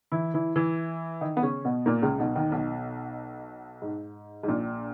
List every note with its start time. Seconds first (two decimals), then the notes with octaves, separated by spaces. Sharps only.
0.12 E3 E4
0.34 E3 E4
0.56 E3 E4
1.21 D#3 D#4
1.37 B3
1.42 C#3 C#4
1.65 B2 B3
1.86 A#2 A#3
2.02 C#2 C#3
2.19 B1 B2
2.35 D#2 D#3
2.52 B1 B2
3.82 G#2
4.43 G#2
4.48 A#1 A#2